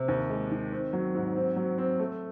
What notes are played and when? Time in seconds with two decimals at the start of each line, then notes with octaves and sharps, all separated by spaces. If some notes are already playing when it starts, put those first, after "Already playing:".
Already playing: C3
0.08 D#2
0.30 G#3
0.50 D#3
0.72 C4
0.93 F#3
1.14 G#2
1.36 C4
1.56 F#3
1.78 C4
1.99 A3